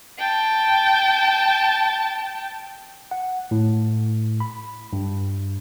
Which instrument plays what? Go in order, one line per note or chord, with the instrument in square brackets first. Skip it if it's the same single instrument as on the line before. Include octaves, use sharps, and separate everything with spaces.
[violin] G5 A5
[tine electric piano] F#5
A2
B5
G2